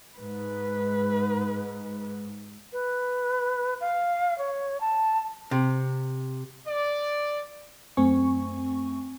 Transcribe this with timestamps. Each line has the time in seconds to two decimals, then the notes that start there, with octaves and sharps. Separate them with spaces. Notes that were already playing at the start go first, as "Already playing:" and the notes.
0.19 G#2 B4
2.73 B4
3.81 F5
4.38 C#5
4.81 A5
5.51 C3
6.67 D5
7.97 F#2 A3 C4 G#5 C#6